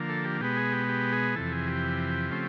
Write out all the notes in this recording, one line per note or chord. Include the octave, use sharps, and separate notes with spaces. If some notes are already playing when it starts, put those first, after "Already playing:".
Already playing: D3 F3 A#3
A4
G4
B2 G#3 B3 G4
G#4
G4
G4
G#4
F2 C3 E3 A4
G#4
G4
C#3 F3 A3 C4